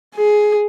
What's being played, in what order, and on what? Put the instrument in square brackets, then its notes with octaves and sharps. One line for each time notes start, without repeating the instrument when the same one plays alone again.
[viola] G#4